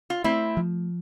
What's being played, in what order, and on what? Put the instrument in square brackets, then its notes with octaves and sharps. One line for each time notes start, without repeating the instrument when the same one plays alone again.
[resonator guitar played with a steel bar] F4
[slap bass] A3 [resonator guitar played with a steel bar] C4 E4
[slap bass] F3